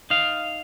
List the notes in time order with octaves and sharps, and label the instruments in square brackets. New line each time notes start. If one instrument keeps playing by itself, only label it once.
[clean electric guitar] D#4 F5